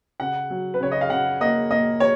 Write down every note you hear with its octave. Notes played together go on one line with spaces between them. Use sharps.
C#3 F#5
F#3
B4
C#3 C#5
D#5
F5
C#3 F#5
A#3 D#5
A#3 D#5
C#5